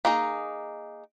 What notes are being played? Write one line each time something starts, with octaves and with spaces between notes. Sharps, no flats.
A#3 D#4 G#4